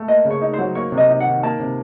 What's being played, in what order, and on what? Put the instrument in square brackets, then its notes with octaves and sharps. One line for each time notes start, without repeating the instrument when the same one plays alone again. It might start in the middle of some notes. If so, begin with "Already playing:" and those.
Already playing: [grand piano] A3
[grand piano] A#3 [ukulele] D#5
[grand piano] C#3
[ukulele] C#5
[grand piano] D#4
[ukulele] C5
[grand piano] F#3
[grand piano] A#3 [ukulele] C#5
[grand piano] C3
[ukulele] D#5
[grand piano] D#4
[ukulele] F#5
[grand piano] D#3
[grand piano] A#3 [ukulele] A5
[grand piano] C3